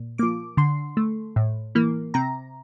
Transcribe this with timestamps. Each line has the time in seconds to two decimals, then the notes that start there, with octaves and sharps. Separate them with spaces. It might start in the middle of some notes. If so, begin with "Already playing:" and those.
Already playing: A#2
0.18 F3 A#3 D6
0.57 D3 C6
0.97 A3
1.36 A2
1.75 E3 A#3
2.14 C3 A#5